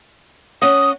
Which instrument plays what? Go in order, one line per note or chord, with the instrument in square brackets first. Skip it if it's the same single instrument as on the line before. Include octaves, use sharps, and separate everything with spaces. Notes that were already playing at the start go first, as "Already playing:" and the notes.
[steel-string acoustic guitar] C#4 F#5 [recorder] D#6